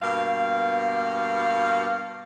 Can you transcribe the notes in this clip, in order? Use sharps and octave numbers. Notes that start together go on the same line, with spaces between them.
G2 B2 A#3 F5